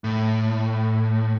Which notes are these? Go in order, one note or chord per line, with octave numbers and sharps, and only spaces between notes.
A2